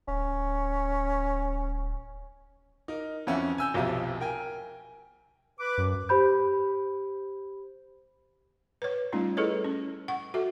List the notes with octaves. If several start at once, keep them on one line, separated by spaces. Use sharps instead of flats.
D1 C#4
D#4 A#4
F2 E3 C#4 E5 F#5
G#5 E6 G6
F1 B1 B2 F3 G4 E5
A#4 G5 G#5
B4 D6
F#2
G4 C5 B5 G6
B4 C#5
G3 A3 C#4 D#4 F4
E4 G#4 A4 B4 C#5 D#5
C#4
F#5 C#6
F#4 A4 E5